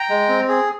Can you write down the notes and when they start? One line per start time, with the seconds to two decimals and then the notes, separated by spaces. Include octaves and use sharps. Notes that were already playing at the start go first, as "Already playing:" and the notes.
Already playing: G5 A#5
0.09 G#3
0.29 C4
0.49 G#4